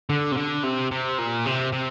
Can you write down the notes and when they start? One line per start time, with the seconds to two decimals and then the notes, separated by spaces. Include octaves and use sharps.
0.10 D3
0.32 C3
0.37 D3
0.64 C3
0.91 C3
1.18 A#2
1.45 C3
1.72 C3